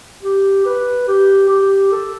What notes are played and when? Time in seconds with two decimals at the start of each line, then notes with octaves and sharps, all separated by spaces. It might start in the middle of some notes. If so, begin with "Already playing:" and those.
0.22 G4
0.65 B4
1.08 G4
1.49 G4
1.92 A4